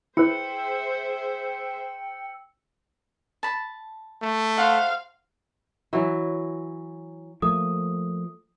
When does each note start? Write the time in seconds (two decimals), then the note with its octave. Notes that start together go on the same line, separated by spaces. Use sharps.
0.17 E4 G#4 B4 C5 E5 G5 E6 C#7
3.43 A5 B5
4.22 A3
4.57 C5 F5 F#5
5.93 E3 F#3 E4
7.42 F3 A3 A#3 D#6